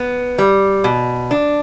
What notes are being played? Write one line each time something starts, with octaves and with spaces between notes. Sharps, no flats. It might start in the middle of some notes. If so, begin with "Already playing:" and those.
Already playing: B3
G3
B2
D4